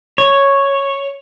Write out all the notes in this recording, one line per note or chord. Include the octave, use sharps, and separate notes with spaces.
C#5